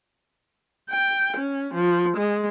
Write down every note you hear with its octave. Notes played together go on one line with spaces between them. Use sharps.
G5
C#4
F3
G#3